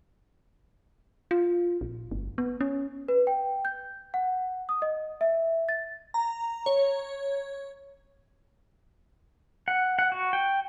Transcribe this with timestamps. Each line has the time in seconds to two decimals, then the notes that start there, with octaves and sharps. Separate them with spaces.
1.31 F4
1.81 A#1
2.11 G1
2.38 B3
2.61 C#4
3.08 B4
3.27 G5
3.65 G6
4.14 F#5
4.69 D#6
4.82 D#5
5.21 E5
5.69 A6
6.14 A#5
6.66 C#5
9.68 F#5
9.99 F#5
10.12 F#4
10.33 G5